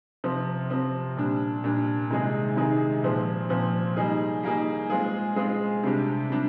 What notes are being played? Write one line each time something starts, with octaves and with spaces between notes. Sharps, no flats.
C3 F3 C4
C3 F3 C4
A#2 G3 D4
A#2 G3 D4
C3 D#3 G#3 D#4 G#4
C3 D#3 G#3 D#4 G#4
A#2 F3 C4
A#2 F3 C4
G3 A#3 D#4 G#4
G3 A#3 D#4 G#4
G#3 C4 F4 G#4
G#3 C4 F4 G#4
C3 G3 D4 G4
C3 G3 D4 G4